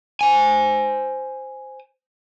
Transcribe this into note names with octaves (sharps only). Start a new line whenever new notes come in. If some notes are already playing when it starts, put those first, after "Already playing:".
C5 G#5